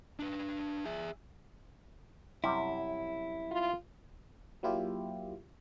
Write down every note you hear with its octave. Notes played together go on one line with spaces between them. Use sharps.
D4 B4
G#4 E5
F#2 C3 G3 E4
F4
F#3 A#3 E4 F4 G4